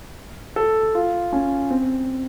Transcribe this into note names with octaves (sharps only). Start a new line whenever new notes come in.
A4
F4
C#4
C4